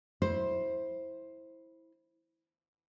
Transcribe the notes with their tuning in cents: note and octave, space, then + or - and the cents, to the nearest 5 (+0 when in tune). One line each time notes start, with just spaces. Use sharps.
E4 -10 C5 +10